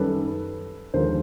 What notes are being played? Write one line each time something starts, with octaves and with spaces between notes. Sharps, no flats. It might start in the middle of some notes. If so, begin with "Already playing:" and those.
Already playing: F#2 D#3 G3 A4 B4
D#2 D3 F3 G#3 A#4 C5